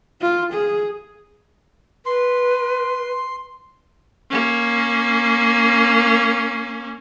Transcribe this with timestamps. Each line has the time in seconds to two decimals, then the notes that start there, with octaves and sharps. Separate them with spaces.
0.21 F4
0.54 G#4
2.06 B4 C6
4.30 A#3 C#4